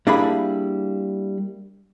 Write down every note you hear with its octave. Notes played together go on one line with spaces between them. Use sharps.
G3 A#3 D4 E4 G#4 B5